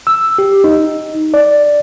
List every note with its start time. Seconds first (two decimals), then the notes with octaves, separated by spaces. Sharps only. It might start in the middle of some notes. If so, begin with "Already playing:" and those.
0.07 E6
0.38 G4
0.64 D#4
1.34 D5